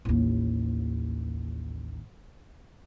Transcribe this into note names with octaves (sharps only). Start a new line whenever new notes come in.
A1 D#2